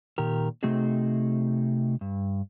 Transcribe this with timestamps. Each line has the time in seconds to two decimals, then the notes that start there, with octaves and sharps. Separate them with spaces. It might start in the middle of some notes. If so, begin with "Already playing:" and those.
0.18 A#2 D#3 G4 A#4
0.63 C3 A3 C4 D#4 F#4 G#4
2.01 G2